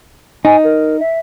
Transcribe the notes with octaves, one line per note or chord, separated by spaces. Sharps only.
D#4 G#5
A#4
E5